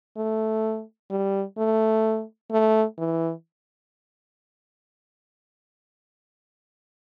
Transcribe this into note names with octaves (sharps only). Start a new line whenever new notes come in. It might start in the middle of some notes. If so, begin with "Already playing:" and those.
A3
G3
A3
A3
E3